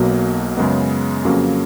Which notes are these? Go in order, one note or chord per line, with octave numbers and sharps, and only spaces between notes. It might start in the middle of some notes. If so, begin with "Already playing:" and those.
Already playing: B1 B2 F#3 A#3
F#2 C#3 G#3 B3
F2 C#3 F#3 A#3 C#4